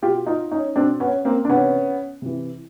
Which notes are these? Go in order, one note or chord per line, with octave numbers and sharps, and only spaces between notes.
B2 F4 G4
D#4 F4
C#4 D#4
B2 C4 D4
B3 C#4
A#3 C4
D4
C3 E3 B3 C#4
C3 E3